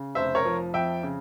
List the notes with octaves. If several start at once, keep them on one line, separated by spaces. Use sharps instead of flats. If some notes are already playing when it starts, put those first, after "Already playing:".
Already playing: C#3
F1 C5 E5
A#4 C#5
F3
F2 E5 G5
C#3